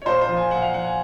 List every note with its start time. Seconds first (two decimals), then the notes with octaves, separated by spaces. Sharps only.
0.02 C#5
0.06 A#2 C5
0.21 C5
0.29 F3
0.37 G#5
0.50 A#2 F#5
0.62 F5
0.74 F3 F#5
0.85 G#5